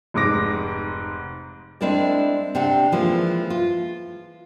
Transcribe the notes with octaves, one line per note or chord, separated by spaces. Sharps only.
F1 G#2 D6 A#6 D7
G#3 C4 D4 E4 A#4 D5
C3 C4 D4 G4 F#5
E3 F3 G#3 A#3
F4